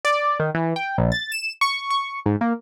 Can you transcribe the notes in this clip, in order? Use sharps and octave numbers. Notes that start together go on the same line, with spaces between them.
D5
D#3
E3
G5
A#1
A6
E7
C#6
C#6
G#2
A#3